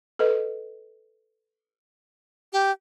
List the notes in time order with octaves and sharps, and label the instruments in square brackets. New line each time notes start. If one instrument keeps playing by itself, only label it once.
[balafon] A4 B4 D#5
[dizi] G4